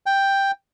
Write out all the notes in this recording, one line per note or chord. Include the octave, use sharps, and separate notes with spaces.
G5